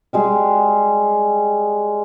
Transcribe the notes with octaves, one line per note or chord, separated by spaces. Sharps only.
G3 G#3 G#4